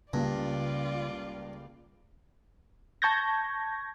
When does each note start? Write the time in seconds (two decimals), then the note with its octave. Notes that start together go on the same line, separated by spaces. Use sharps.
0.13 C#2 G2 C#3 A#3 F4 G4 D5
3.02 A5 C#6 G6 G#6 A#6